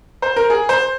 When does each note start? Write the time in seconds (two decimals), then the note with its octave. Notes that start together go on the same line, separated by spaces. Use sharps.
0.22 C5
0.36 A#4
0.50 G#4
0.69 C5